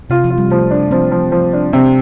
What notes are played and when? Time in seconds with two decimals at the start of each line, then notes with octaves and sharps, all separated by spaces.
0.10 C3 F4
0.24 F3
0.30 F4
0.38 G3
0.50 F3 A3
0.71 D4
0.91 F3 C4
1.11 F3
1.32 F3
1.53 D4
1.73 C3 C4